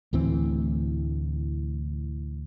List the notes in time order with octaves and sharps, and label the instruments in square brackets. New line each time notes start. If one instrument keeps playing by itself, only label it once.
[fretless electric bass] D2 A2 E3 C4